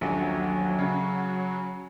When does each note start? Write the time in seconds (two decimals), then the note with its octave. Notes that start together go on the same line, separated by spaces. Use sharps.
0.01 D#1 A#1 F#3
0.79 C#3